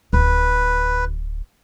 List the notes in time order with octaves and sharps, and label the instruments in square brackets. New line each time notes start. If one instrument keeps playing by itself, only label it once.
[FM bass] D1 [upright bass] D2 [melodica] B4